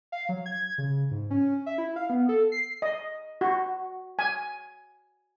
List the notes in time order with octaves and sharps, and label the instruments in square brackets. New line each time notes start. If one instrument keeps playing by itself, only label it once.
[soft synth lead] F5
F#3
G#6
C#3
G#2
C#4
E5
E4
F5
B3
A4
C7
[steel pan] D#5
F#4
G#5